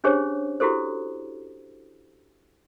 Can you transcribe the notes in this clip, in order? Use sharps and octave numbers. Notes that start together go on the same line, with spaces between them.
C#4 D4 G4 G#4 C5 C#5
E4 F#4 G4 A4 C5